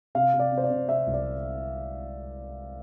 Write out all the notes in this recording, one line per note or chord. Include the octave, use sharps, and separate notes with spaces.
C3 F5
C3
D5
C3
C5
D5
C3
C3 E5
C2
D5